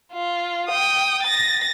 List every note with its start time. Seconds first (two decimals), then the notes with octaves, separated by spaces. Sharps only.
0.13 F4
0.69 G5 D#6
1.23 A6 A#6